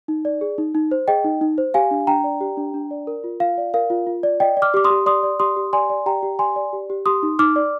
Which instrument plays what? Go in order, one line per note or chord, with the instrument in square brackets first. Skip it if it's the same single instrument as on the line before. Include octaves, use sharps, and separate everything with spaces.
[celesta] D#4
D5
G#4
D#4
D#4
C5
G#4 D#5 G5
D#4
D#4
C5
G4 F5 G#5
D4
D4 G5 A#5
D5
G4
D4
D4
D5
A#4
F4
F4 F5
D5
A#4 F5
F4
F4
D5
D5 D#5 G5
D5
D6 F6
G4 D6
C6 D#6
G4
D5 C6 D#6
D5
G4 C6 D#6
G4
D5 G#5 C6
D5
G4 G5 A#5
G4
D5 G#5 C6
D5
G4
G4
G4 C6 D#6
D#4
D#4 D6 F6
D5